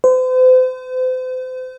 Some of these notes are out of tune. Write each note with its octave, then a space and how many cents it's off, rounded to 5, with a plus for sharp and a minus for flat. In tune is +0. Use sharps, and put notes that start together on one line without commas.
C5 -40